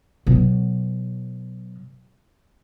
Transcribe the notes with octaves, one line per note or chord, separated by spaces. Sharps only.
B2 F#3